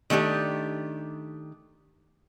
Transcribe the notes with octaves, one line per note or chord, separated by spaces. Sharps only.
D#3 A3 D4 G4